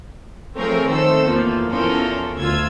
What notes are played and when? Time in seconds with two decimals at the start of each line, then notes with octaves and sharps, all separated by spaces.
0.56 F3 A3 C4 G#4 A#4 C#5
0.89 D#3 A3 A4 C5 E6
1.26 E2 F3 A#3
1.69 E2 F3 C#4 A4 A#4 C6
2.37 D2 F4 E6 G#6